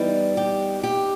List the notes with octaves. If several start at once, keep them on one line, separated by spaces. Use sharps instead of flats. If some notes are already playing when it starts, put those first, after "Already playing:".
Already playing: E3 G3 B3 D#4
G4
G4